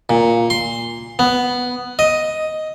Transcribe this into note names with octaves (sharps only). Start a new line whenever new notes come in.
A#2
C6
B3
D#5